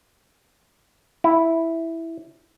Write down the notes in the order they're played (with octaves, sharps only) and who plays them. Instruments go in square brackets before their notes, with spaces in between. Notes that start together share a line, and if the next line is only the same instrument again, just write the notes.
[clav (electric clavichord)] E4